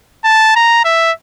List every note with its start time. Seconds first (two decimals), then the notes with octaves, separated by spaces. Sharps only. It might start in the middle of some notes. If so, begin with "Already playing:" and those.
0.24 A5
0.56 A#5
0.85 E5